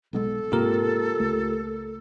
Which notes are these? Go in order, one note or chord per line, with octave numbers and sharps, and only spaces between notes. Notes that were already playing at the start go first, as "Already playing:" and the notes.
B1 B2 G#3 A4
G#2 C3 A#3 F4 G4 A#4
C#2 A3